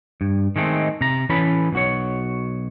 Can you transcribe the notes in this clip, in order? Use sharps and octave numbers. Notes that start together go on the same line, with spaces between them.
G2
D#3 G#3 A3 C4
C3 A#5
E3 C#4 A4 B4 B5
B1 F#4 C#5